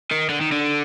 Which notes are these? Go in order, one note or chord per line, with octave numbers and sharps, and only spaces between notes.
D#3
D3
D#3
D3